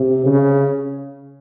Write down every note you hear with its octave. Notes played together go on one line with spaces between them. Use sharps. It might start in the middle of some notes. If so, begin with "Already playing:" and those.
Already playing: C3
C#3